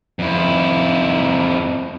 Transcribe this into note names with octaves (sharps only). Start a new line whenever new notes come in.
F2 E4